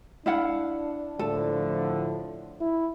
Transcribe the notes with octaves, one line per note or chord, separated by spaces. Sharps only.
D4 E4 F5 F#5
A2 D3 F3 A4
E4